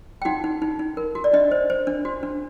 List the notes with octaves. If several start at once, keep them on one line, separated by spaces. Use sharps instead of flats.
G5
D#4 F#4 F#5
D#4
D#4
D#4
A#4
F#4
D5
D4 D#5
C5
C5
D4
F#4
D4